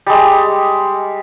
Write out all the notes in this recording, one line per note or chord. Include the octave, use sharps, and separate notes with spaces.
G3 G#3